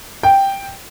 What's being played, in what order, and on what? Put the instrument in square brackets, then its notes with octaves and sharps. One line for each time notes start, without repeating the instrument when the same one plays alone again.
[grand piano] G5